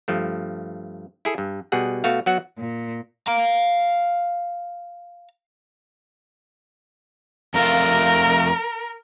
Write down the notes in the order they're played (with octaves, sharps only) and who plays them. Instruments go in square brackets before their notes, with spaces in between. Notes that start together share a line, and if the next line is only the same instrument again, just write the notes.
[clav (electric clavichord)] G2 F3 A3
E4 G#4 A4
G2
B2 G3 G#4 F#5
B2 A3 F#4 F5
F#3 B3 F#4 F#5
[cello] A#2
[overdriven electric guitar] F5 A#5
[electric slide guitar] F2 A3 F4 [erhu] A#4